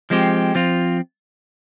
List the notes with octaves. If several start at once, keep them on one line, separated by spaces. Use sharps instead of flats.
F3 G#3 C4 G4
F3 C4 F4